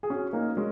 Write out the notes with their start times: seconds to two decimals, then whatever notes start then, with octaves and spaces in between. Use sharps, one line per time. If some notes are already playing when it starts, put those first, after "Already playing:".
0.03 G#4
0.10 C#4 F#4
0.33 A#3 D#4
0.57 G#3 C#4